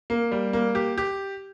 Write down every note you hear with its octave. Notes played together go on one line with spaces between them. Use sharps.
A#3
G3
A#3
G4
G4